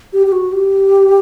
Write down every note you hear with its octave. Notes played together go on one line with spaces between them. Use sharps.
G4
G4
F#4
G4